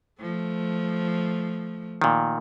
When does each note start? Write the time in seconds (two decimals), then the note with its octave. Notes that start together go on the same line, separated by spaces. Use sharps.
0.21 F3 A3
2.02 A#2 D#3